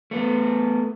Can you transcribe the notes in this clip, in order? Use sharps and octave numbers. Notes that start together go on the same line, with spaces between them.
A3 B3